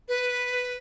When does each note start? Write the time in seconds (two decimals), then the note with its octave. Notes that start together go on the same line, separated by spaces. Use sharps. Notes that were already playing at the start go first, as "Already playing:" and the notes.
0.08 B4